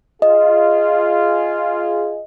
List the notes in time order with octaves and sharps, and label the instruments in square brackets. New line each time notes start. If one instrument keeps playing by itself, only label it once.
[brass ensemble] F4 G#4 [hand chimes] D#5